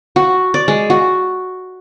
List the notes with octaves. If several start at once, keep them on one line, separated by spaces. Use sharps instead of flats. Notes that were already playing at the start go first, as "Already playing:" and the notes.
F#4
D5
G#3
F#4